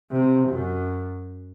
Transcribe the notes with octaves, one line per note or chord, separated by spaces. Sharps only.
C3
F#2